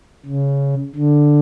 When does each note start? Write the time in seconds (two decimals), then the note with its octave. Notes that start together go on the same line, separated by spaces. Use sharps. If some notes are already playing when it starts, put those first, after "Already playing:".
0.26 C#3
0.95 D3